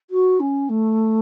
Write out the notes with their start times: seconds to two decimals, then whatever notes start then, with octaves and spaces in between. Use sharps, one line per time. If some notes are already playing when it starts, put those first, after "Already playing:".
0.10 F#4
0.40 C#4
0.69 A3